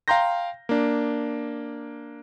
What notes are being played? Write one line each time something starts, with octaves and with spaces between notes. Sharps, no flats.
F5 G5 A#5 C6 G6 A#6
A#3 D4